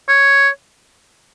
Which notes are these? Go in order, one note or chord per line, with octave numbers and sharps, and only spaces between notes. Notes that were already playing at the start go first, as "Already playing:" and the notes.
C#5